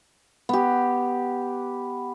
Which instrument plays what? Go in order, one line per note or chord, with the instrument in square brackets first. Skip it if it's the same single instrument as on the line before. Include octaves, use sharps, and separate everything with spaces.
[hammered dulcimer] B3 G4